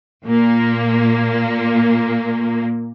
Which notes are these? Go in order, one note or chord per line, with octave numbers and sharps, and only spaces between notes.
A#2 A#3